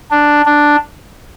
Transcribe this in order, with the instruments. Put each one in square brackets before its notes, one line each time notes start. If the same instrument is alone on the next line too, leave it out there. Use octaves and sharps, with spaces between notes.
[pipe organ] D4
D4